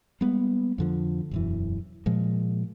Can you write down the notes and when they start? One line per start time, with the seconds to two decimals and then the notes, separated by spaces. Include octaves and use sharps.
0.21 G3 G#3 A#3 B3
0.78 F2 D3 F3
1.31 E1 F#2 E3
2.06 A#2 F3 G#3